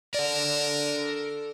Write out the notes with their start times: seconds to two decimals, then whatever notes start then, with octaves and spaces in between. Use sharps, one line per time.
0.14 A4 A#4 D5